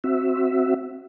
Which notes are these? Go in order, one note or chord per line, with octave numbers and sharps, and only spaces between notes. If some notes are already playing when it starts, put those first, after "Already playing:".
C4 F#4 E5